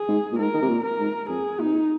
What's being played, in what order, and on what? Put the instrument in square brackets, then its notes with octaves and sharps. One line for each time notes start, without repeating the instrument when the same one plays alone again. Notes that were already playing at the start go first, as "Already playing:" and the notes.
Already playing: [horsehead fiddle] G#4
[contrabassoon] G#2
A#2
[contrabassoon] G#2 [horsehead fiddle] A#4
[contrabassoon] D#3
C3
A#2
[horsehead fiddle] A#4
[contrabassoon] G#2
[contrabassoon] F2 [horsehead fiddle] G#4
[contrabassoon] A#2 [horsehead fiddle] D#4
[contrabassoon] C3
A#2